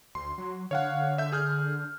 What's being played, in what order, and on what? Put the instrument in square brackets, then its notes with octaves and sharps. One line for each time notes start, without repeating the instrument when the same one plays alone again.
[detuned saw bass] D2 [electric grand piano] C6
[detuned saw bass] F#3
[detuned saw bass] D3 [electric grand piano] C#5 F5 F#5
[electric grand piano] E5 G6
G#4 F6 G6